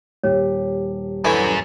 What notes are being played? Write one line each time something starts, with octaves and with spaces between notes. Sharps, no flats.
D#1 G4 C#5
F#2 D3 E3 C#4